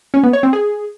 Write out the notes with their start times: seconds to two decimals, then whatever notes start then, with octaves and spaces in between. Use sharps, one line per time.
0.14 C#4
0.24 B3
0.33 C#5
0.43 C4
0.53 G#4